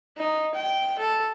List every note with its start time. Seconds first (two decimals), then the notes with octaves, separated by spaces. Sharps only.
0.17 D#4
0.55 G5
0.99 A4